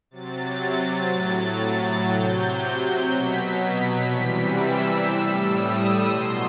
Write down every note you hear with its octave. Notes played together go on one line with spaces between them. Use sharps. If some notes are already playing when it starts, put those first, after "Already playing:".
C3 F#3 A6
A2 F#3
C3 F#3 G6
B2 F#3 B6
B6
C3 E3 G3
E6
A2 G3 E6
D#6
B2 F#3 C6